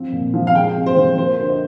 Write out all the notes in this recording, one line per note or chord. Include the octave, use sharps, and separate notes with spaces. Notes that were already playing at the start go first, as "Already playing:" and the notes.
Already playing: F3 C4
A#2
F3
F5
G#3 G5
C3
C5
F3
A#3 C5
D3 C5
D#5